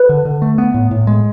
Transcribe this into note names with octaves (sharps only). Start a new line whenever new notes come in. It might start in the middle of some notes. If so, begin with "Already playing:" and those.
Already playing: B4
D3
D3
A3
B3
A2
A2
G#3